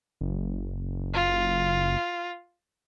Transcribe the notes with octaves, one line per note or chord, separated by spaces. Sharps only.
F#1
F4